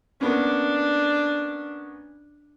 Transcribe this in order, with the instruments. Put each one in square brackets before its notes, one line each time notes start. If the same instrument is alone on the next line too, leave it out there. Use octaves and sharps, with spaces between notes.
[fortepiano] A#3 B3 C#4 [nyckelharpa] D4